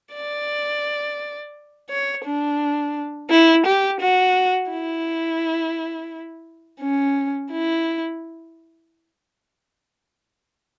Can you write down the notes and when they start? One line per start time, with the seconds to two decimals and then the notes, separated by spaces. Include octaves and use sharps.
0.14 D5
1.90 C#5
2.25 D4
3.30 E4
3.66 G4
4.00 F#4
4.71 E4
6.81 C#4
7.52 E4